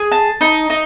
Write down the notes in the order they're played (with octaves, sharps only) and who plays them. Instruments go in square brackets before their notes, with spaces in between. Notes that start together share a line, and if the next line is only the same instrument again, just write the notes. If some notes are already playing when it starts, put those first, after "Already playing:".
Already playing: [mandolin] G#4
A5
D#4
D#4